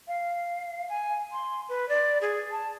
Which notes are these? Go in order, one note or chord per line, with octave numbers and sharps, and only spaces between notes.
F5
G#5
C6
B4
D5
G#4
A5